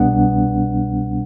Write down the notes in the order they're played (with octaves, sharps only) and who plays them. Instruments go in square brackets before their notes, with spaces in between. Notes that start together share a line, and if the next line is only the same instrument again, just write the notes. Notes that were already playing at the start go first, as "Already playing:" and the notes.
Already playing: [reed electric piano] C2 B2 G3 B3 D4 F#5